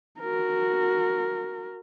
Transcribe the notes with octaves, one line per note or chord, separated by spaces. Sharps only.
F#4 A#4